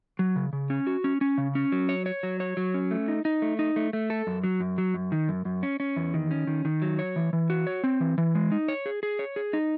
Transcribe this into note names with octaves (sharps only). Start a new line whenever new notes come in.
F#3
C#3
C#3
C#4
F#4
C#4
C#4
C#3
C#4
F#3
C#5
C#5
F#3
C#5
F#3
C#4
A3
D#4
D#4
A3
D#4
A3
A3
A4
F#2
F#3
F#2
F#3
F#2
D#3
F#2
F#2
C#4
C#4
E2
D#3
C#4
D#3
D#3
F#3
C#5
E3
E3
F#4
C#5
C4
E3
E3
G#3
D#4
C#5
G#4
G#4
C#5
G#4
D#4